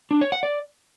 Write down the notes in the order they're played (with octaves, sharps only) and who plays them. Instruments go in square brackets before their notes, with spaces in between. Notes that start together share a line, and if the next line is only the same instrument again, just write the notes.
[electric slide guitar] D4
C#5
F#5
D5